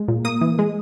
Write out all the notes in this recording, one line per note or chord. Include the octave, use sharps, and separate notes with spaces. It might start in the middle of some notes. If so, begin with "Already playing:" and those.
Already playing: G#3
A#2
A#3 D#6
E3
G#3